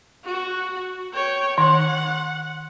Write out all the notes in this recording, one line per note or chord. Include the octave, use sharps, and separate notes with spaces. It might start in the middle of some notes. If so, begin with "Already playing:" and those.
F#4
C#5 G5
D#3 F#5